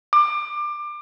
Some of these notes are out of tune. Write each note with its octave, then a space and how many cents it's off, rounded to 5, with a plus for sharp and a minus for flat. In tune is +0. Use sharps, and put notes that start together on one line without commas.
D6 +25